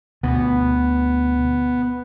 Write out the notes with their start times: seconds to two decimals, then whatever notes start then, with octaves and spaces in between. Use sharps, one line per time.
0.23 D2 B2 B3